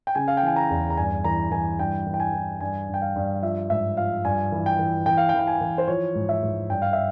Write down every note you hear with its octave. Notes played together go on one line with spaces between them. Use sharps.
G5
C#3 G#5
F5
G5
E3 G#5
A#5
E2
A#5
G2 G#5
E3 A#5
E3 G#5
G2 G5
E3
G5
G#5
E3
G2 G#5
G2
G5
F5
G2
F3 E5
G#2 E5
F3 F5
G2 G#5
E3
G5
E3
E3 G5
F5
G5
E3
G5
G#5
E3
C5
F3 C#5
G#2
E5
G#2
G2 G5
F5
E5